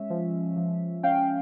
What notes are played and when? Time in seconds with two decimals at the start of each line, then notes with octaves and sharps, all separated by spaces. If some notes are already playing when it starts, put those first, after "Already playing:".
Already playing: G#3 C#4 E5
0.10 F3
0.57 F3
1.03 C#4 F5 G5